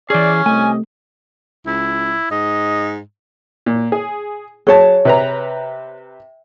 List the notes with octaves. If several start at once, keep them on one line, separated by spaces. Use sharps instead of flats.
E3 C#4 G#4 D5
C2 A3 G4 D#5 G#5
C#2 E4
G#2 D#5
A#2
G#4
F#3 G#4 C#5 A5
C3 B4 A#5